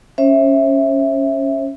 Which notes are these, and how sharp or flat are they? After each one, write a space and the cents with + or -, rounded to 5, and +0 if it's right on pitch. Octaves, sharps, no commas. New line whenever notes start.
C#4 +0 C5 +40 E5 +0